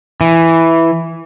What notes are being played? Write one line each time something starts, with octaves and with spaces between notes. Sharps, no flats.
E3